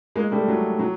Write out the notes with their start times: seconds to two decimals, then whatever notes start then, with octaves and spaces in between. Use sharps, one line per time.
0.16 G#3 A#3
0.32 G3 A3
0.48 F#3
0.79 F#3